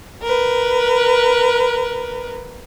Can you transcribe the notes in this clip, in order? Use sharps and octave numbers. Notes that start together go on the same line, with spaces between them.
A#4 B4